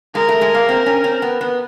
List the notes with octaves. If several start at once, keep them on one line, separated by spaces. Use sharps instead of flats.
G#3 A#4
A3
G#3
A#3
C4
C#4
C4
B3
B3